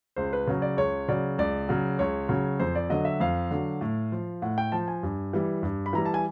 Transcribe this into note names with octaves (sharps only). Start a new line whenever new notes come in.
C#2 C5
B4
C#3 F#3
D5
C#2 C#5
C#3 F#3 D5
C#2 D5
C#3 F#3
C#2 C#5
C#3 F#3
F2 C5
D5
D3 F#3 D#5
E5
F2 F5
D3 F#3
A2
F3
A2 F#5
G5
F3 A5
G#5
G2
E3 G3
G2
B5
E3 G3 A#5
A5
G#5